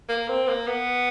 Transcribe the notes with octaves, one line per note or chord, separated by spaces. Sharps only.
A#3
C4
A#3
B3